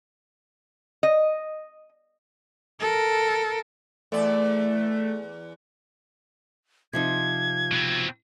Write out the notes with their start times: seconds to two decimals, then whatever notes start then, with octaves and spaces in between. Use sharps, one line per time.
1.03 D#5
2.81 A4 A#4
4.12 E2 A3 D5
6.93 C3 F3 D#4 G#6
7.72 B2 C4